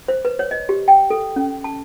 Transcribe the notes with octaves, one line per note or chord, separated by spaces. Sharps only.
C5
B4
C#5
D#5
G4
G5
A4
C#4
A5